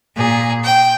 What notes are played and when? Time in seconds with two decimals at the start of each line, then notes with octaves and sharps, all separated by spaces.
0.15 A#2 G#4
0.64 G5